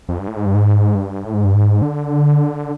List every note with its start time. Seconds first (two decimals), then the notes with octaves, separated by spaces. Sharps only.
0.09 F2
0.19 G2
0.28 A2
0.37 G#2
0.46 G2
0.55 G#2
0.95 G2
1.25 A2
1.34 G#2
1.45 G2
1.54 G#2
1.82 D3